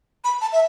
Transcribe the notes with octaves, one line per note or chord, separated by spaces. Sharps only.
B5
A5
E5